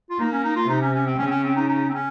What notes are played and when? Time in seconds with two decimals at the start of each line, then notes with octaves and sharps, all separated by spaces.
0.10 F4
0.19 A#3 D#4
0.32 C#4
0.44 D#4
0.56 F4
0.68 C3 D#4
0.81 C#4
0.94 C#4
1.06 C4
1.18 C#3 C#4
1.26 C4
1.31 C#4
1.44 C4
1.56 D#4
1.68 D#4
1.89 C4
1.94 C#4